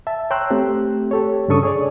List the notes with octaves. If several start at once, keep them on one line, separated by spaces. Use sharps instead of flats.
E5 A5
C#5 G5 A#5 C6 E6 F#6
A3 C4 G4
G4 A4 C#5
G2 C#3 D4 A4 C#6 D#6
G#4 C#5 D5